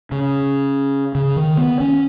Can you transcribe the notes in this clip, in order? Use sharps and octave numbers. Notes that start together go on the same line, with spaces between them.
C#3
C#3
D#3
B3
C#4